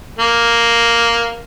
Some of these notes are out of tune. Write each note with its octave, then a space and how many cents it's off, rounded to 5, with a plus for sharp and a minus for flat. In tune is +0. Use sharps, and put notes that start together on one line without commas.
A#3 +0